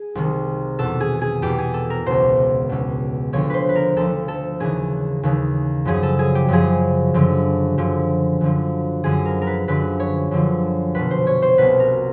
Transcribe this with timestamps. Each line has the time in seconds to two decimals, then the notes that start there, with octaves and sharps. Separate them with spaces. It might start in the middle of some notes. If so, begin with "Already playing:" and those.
Already playing: G#4
0.15 C2 C3 D#3
0.79 E2 B2 A4
1.00 G#4
1.21 G#4
1.42 E2 B2 G4
1.58 G#4
1.74 A4
1.90 A#4
2.06 C#2 B2 C5
2.69 C#2 B2
3.33 D2 D3 F3 C#5
3.50 B4 C5
3.69 B4
3.76 A#4
3.96 D2 D3 F3 A4
4.28 A4
4.60 D#2 C#3 E3 G#4
5.23 D#2 C#3 E3
5.85 F#2 C#3 F3 G#4
6.03 A4
6.19 G#4
6.35 G4
6.48 F#2 C#3 F3 G#4
7.14 F#2 D3 F3
7.78 F#2 D3 F3
8.41 F#2 D3 F3
9.04 F#2 D3 F3 G#4
9.26 A#4
9.42 A#4
9.47 B4
9.68 F#2 D3 F3 B4
10.00 C#5
10.31 F#2 D3 F3
10.95 C2 B2 B4
11.11 C5
11.27 C#5
11.42 C5
11.58 C2 B2 B4
11.80 A#4